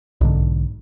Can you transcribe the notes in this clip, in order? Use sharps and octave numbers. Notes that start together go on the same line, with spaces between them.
B1 G#2 D3